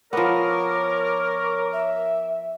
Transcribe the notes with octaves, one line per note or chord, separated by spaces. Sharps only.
F3 B3 A#4 C#5 D6
E5